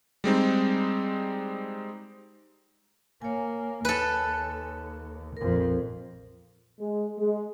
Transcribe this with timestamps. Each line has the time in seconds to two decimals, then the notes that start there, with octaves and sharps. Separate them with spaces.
0.24 G3 G#3 C4 D#4
3.22 A#3 C#5 G#5
3.85 D#2 A4 B4
5.37 A#1 F2 A#4
6.80 G#3
7.18 G#3